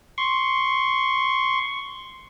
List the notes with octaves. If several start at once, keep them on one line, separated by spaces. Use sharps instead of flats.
C6 C#6